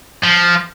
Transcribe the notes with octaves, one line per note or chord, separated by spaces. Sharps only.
F3